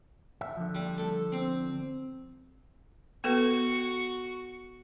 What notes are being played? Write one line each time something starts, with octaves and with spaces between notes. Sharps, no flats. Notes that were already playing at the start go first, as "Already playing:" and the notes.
E5
D3 F3
G3
A4
C4
B3 F#4 A4 B4 C#6